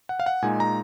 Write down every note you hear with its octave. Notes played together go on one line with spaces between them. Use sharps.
F#5
F5
F#5
A#2 G#3 D#4 G#5
A#5